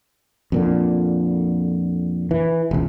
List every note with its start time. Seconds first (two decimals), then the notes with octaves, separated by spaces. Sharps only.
0.52 F2 A#2 D3
2.31 E3
2.71 E1 C#2